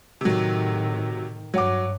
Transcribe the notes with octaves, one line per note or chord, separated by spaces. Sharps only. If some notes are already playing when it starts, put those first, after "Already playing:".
A2 C3 D#3 F#3
G2 F#3 C#5 F#5 D6